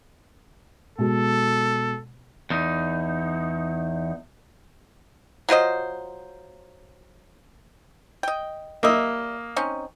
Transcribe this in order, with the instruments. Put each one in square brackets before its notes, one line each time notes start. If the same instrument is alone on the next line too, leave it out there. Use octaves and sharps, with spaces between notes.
[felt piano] B2 G#3 [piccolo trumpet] A4
[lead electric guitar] E2 D#4
[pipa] F#3 F4 C5 D#5
D#5 G5
[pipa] G3 E5 [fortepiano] A#3 D#5
[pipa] C4 C#4 D#4